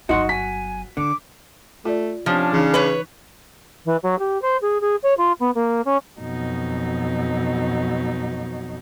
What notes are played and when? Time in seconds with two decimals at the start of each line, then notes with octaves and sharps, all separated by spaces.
0.09 G1 F#3 D#4 F#4 F#5 C6
0.29 G#5 B6
0.97 D3 C#4 D6
1.85 A3 F4 D5
2.26 C3 F3 C#4 D4
2.53 C#3 E3 D#4
2.74 B4 C#5
3.85 E3
4.03 F#3
4.19 G4
4.42 C5
4.61 G#4
4.81 G#4
5.03 C#5
5.17 F4
5.39 B3
5.55 A#3
5.85 C#4
6.20 F2 B2 F#3 D#4